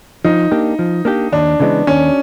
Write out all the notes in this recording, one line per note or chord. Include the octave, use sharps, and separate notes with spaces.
F3 D#4
A#3 D4 G4
F3
A#3 D4 G4
D#2 D4
C#3 E3 G#3 B3
D#2 C#4